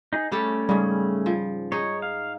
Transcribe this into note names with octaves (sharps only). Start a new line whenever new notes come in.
D#4 G#4
G3 A3 C#4 G4 A4
G#2 C#3 G3
F3
D#4 G#4 C#5
F5